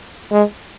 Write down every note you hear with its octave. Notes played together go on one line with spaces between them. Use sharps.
G#3